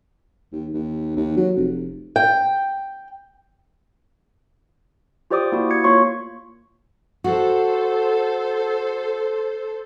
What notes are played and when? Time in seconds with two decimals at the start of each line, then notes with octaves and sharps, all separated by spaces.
0.52 D#2
0.73 D#2
1.17 D#2
1.37 F#3
1.56 F1
2.16 G5
5.31 F4 G4 C5 D5 D6 D#6
5.52 A#3 E4 F#4
5.71 G#6 C#7
5.84 A#3 F4 C#5 C6 C#6
7.24 F#4 A4 C5